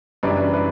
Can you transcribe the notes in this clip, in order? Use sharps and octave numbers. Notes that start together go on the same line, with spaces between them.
F#1 F#2 E3 G3 D4 B4 D5
B4